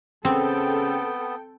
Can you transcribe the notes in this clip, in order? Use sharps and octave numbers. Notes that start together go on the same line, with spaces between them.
C#3 B3 C4 A4 G5